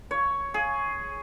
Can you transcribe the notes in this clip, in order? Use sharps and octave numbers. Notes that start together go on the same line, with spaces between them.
C#5
G#4